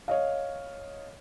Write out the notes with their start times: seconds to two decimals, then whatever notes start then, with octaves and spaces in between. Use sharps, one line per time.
0.08 C#5 D#5 F5